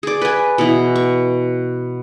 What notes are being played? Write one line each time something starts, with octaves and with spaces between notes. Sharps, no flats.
G#4 D5
B4 G#5
B2 E3
C#6